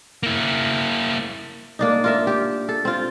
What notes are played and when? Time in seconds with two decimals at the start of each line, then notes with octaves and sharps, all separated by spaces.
0.23 A#3 E4
1.79 A#3 D4 D#4
2.04 F4 A#4 E5
2.27 G4
2.69 A4
2.85 C4 F4